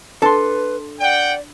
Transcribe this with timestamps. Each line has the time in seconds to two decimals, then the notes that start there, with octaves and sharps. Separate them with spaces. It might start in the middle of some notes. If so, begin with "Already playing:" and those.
0.22 D4 A4 B4 A5 C6
1.00 D5 F#5 G5